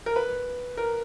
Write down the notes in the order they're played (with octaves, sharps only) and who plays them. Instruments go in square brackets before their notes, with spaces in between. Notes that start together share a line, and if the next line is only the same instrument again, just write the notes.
[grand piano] A#4
B4
A#4